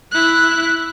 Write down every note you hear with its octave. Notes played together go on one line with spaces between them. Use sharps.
E4 F#6